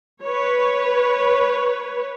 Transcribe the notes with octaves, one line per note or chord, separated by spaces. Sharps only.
B4 C#5